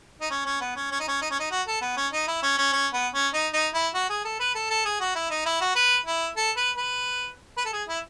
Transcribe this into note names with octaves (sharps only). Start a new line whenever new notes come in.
D#4
C#4
C#4
B3
C#4
C#4
D#4
C#4
D#4
C#4
D#4
F#4
A4
B3
C#4
D#4
E4
C#4
C#4
C#4
B3
C#4
D#4
D#4
E4
F#4
G#4
A4
B4
A4
A4
G#4
F#4
E4
D#4
E4
F#4
B4
E4
A4
B4
B4
B4
A4
G#4
E4